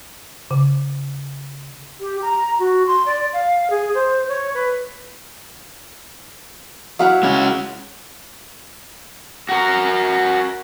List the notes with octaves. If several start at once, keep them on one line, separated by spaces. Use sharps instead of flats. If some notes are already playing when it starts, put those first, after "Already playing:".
C#3
G4
A#5
F#4
C6
D5
F5
G#4
C5
C#5
B4
F#3 E4 C#5 F5 F#5
G#3 C#4
F#4 A#4